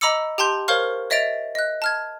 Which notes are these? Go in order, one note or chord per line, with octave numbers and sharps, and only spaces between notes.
D#5 A#5 B5 D6 E6 C#7
G4 G5 A5 C6 G6
A#4 C5 C#5 F5 C#6 F6
C#5 D#5 E5 A6 D7 F7
D#5 F#6
A5 F6 G#6